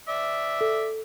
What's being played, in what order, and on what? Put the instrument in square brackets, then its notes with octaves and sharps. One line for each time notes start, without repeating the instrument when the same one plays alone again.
[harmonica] D5 E5
[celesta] A4